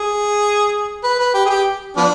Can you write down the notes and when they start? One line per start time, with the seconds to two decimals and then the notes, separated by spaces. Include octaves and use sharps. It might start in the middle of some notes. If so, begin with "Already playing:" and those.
Already playing: G#4
1.04 B4
1.19 B4
1.34 G4
1.46 G#4
1.50 G4
1.97 F3 B3 D4